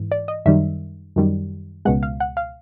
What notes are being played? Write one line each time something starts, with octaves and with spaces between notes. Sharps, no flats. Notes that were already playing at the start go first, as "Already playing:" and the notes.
Already playing: G#2 E3
D5
D#5
F#2 D#3 G3 E5
F#2 D#3 G3
C#2 B2 G#3 F#5
F5
F#5
F5